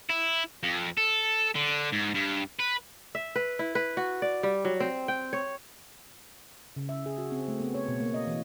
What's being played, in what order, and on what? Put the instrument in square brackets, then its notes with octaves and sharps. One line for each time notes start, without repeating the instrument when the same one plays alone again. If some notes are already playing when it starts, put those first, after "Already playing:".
[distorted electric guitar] E4
F2
A4
D3
G#2
G2
B4
[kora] E5
B4
E4
B4
F#4
D5
G3
F#3
C4
G5
C#5
[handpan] C#3
E5
G#4
F#4
C4
A3
B3
C#5
B2
A#3
D#5
E3